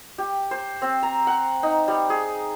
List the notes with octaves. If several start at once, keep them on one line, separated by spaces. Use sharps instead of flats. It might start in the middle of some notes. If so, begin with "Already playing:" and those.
G4
C5
C4
A#5
F#5
D#4
G3
G#4